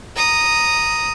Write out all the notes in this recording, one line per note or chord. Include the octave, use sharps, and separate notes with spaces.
A#5 D#6